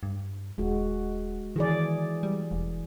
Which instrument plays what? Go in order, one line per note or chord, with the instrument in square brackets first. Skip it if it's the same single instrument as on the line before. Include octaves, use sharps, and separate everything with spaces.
[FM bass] G2
[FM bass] D#1 [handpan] G#3 F#4
[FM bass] D#3 [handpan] E3 G#4 D5
[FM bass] G3
E1